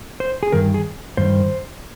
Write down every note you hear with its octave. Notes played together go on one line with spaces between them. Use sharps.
C5
G#4
G2 D#3 A#4
G#4
G2 D#3 C5